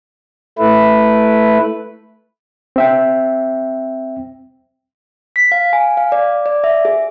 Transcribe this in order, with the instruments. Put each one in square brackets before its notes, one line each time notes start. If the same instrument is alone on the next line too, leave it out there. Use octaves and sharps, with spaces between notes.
[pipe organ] A3 E4 B4
[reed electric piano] C4 E5 G5
[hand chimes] B6
F5
G#5
F5
D5
D5
E5
G#4